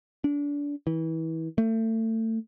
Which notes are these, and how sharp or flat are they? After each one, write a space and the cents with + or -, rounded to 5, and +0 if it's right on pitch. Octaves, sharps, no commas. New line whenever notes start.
D4 -30
E3 -30
A3 +30